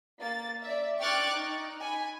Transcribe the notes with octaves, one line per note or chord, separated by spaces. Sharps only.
A#3 A6
D5 E5
G5 C#6 D6 F6 F#6 A6
D#4
G#5 B5